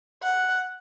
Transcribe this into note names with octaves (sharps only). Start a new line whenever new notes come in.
F#5